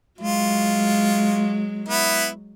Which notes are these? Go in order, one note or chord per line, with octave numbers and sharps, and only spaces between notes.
F#3 G#3 F4
B3 E4